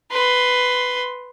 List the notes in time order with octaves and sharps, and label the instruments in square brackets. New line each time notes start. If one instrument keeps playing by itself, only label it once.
[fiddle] B4 C6